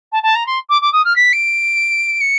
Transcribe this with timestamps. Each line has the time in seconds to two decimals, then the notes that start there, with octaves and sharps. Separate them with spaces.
0.12 A5
0.23 A5
0.35 A#5
0.46 C6
0.69 D6
0.81 D6
0.92 D#6
1.05 F6
1.16 B6
1.33 D7
2.20 C#7